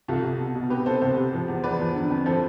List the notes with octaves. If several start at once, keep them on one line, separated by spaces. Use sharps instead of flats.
C2 F4 A4
C2
B2
B2
C3 G4 B4
C3 A4 C5
C2 A4 C5
C3
F3
E2
E2 B4 D5
F3
D3
F2
F3 A4 C5